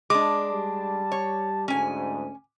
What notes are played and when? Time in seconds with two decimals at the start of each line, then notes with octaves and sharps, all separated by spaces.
0.10 G#3 D4 D6
0.48 G3 A5
1.12 C#5
1.68 D2 G#2 C#4 G#5